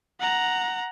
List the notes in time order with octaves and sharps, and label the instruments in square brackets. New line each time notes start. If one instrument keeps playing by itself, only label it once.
[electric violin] F#5 A#5